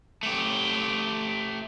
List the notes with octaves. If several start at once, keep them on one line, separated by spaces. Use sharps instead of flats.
A3 G4